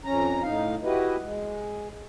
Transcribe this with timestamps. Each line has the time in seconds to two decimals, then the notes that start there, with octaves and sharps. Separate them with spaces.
0.05 F2 C#4 A#5
0.43 A2 D#4 F5
0.84 E4 F#4 G4 B4 D#5
1.22 G#3